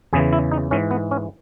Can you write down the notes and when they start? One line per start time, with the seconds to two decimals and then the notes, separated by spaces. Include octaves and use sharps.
0.13 E2 C#3 E3 G#4
0.33 E4
0.51 D#4
0.71 G#2 E3 C#4
0.91 B3
1.11 C#4